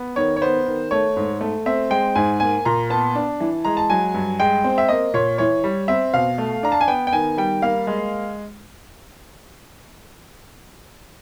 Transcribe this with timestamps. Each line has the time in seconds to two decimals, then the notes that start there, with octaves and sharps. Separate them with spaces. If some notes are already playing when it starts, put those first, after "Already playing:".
Already playing: B3
0.16 D#3 C#5
0.36 C#5
0.42 B3 C5
0.66 D#3
0.91 A3 C#5
1.16 G#2
1.41 A3
1.66 C4 E5
1.90 G#3 G5
2.15 G#2 G#5
2.40 A#3 G#5
2.65 A#2 A#5
2.90 B3 A5
3.15 D4
3.40 E3
3.65 G#3 A#5
3.77 A5
3.90 F#3 G#5
4.14 G2
4.39 G#3 G5
4.64 C4
4.78 E5
4.89 A#3 D#5
5.14 A#2 C#5
5.38 E3 C#5
5.64 G3
5.88 C4 E5
6.14 B2 F5
6.38 A3
6.63 D4 A#5
6.72 A5
6.81 G#5
6.88 B3 G5
7.07 G5
7.13 D#3 G#5
7.37 G3 G5
7.62 A#3 F5
7.87 G#3